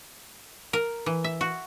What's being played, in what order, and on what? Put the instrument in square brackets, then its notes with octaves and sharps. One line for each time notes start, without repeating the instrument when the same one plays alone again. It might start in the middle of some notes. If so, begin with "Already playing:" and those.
[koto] A#4
E3
E5
F#4